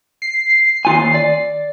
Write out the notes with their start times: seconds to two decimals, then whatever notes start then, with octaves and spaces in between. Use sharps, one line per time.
0.22 C7
0.85 D#2 F4 G#5
1.14 D5